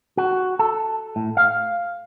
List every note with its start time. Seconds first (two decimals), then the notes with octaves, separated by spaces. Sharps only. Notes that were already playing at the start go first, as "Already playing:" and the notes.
0.17 F#4
0.59 A4
1.16 A2
1.37 F5